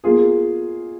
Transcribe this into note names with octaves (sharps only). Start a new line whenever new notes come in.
B2 A#3 F4 G#4